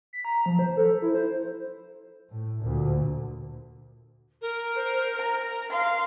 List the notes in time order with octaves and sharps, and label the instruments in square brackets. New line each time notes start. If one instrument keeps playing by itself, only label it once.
[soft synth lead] B6
A#5
F3
C5
A4
E4
C5
[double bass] A2
D2 A#2
[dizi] A#4
[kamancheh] C5
A#5
F5 C6